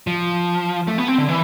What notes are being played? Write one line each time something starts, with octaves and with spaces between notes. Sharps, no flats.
F3
A3
B3
C4
D3
E3